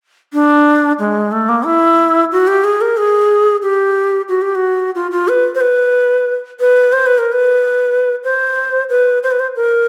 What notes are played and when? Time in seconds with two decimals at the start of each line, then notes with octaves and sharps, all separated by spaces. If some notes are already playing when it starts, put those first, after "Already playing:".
0.33 D4
0.99 G#3
1.32 A3
1.49 A#3
1.65 E4
2.32 F#4
2.47 G4
2.64 G#4
2.81 A#4
2.97 G#4
3.62 G4
4.29 F#4
4.42 G4
4.55 F#4
4.95 F4
5.11 F4
5.28 B4
5.55 C5
5.61 B4
6.60 B4
6.93 C5
7.06 B4
7.18 A#4
7.32 B4
8.24 C5
8.89 B4
9.23 C5
9.31 B4
9.40 C5
9.56 A#4